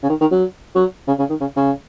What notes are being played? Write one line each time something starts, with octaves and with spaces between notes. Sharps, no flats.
C#3
D#3
D#3
F#3
F#3
C#3
C#3
D#3
C#3
C#3